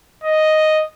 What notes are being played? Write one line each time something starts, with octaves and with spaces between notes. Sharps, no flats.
D#5